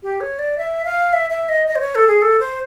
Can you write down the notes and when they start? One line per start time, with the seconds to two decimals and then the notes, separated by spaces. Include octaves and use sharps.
0.03 G4
0.21 C#5
0.39 D5
0.58 E5
0.85 F5
1.13 E5
1.30 E5
1.49 D#5
1.67 D#5
1.76 C5
1.81 C#5
1.95 A4
2.08 G#4
2.22 A4
2.40 C5